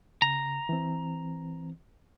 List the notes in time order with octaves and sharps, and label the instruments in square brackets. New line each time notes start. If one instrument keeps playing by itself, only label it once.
[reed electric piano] C#3 [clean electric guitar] A#5
[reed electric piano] E3 C4